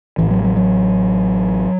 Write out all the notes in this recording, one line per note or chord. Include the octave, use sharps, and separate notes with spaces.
A1 A2 E3
F#3
F#3
F#3